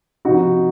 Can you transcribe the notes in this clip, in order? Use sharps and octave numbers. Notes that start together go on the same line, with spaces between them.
C3 F3 C4 D#4 F#4